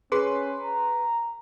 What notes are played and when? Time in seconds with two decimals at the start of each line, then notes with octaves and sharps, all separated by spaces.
0.12 C#4 G#4 B4 C6
0.62 A#5